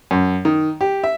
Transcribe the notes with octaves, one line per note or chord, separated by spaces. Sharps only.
F#2
D#3
G4
E5